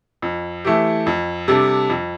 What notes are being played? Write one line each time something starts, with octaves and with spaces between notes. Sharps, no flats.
F2
E3 A3 E4 G4
F2
C3 G3 D4 A4
F2